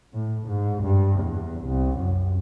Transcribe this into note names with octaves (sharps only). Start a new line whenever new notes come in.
A2
G#2
G2
E2
C2
F#2